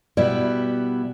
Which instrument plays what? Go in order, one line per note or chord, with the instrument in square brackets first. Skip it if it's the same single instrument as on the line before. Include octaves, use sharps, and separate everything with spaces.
[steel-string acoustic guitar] B2 G3 B3 E4 [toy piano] D5